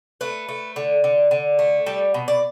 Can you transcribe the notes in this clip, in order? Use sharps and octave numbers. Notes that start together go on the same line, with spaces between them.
A3 B4
A3
D3
D3
D3
A3
G3 A4
B2
D5